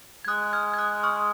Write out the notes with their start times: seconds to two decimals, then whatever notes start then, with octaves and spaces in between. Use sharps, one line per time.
0.25 G#6
0.28 G#3 D#6 F#6
0.53 F6 G#6
0.74 G#6
0.78 D#6 F#6
1.03 C#6 F6